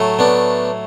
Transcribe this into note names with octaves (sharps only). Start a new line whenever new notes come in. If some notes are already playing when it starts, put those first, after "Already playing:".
Already playing: A2 F#3 A3
B3 D4